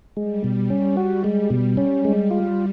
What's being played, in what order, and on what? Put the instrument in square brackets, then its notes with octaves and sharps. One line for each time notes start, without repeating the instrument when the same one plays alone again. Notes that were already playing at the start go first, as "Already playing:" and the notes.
[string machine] G3 [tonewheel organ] G#3
[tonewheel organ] B2
C#4
F#4
G#3
B2
C#4
G#3
F4